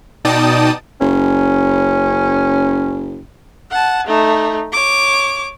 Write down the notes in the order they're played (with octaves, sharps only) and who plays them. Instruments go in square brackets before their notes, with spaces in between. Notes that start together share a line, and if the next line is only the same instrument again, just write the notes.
[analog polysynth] B2 D#4 D5 G5 A5 D#6
[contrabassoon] F#1 [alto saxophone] C#4
[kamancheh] F#5 A5
A3 D#4
C#5 D6